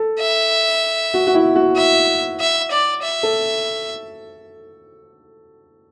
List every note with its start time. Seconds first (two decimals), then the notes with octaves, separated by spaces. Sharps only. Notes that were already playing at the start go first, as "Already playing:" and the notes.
Already playing: A4
0.20 E5
1.14 F#4
1.27 F#4
1.35 E4
1.56 F#4
1.77 E5
2.40 E5
2.71 D5
3.03 E5
3.23 A4